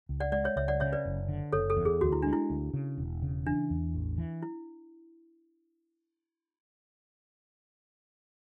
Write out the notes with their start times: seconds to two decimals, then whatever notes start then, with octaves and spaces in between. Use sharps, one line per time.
0.09 C#2
0.20 D5 F#5
0.32 G#3 D5 F#5
0.44 C#5 E5
0.56 C#2 C#5 E5
0.68 D5 F#5
0.80 C#3 C#5 E5
0.93 B4 D5
1.06 F#1
1.28 D3
1.53 F#1 A4 C#5
1.70 A4
1.77 E2
1.85 G#4
2.01 D2 F#4
2.12 E4
2.22 G#3 D4
2.33 E4
2.50 D2
2.73 C#3
2.98 E1
3.22 C#3
3.46 E3 D4
3.70 E2
3.95 A1
4.18 E3
4.43 E4